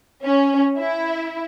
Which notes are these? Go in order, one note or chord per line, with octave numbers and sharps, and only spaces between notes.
C#4
E4